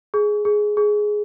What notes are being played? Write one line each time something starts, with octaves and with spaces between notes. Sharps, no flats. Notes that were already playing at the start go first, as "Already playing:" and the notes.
G#4
G#4
G#4